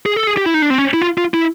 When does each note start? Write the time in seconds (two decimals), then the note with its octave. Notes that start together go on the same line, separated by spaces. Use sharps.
0.06 G#4
0.16 A4
0.27 G#4
0.37 G4
0.46 E4
0.54 D#4
0.62 D4
0.70 C4
0.78 C#4
0.94 E4
1.02 F4
1.18 F4
1.34 E4